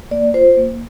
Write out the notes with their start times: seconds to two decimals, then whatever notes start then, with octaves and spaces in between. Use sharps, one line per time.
0.11 A#3 D5
0.34 F4 C5
0.57 A#3